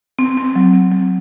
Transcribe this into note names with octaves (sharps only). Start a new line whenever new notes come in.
C4
C4
F#3
C4
F#3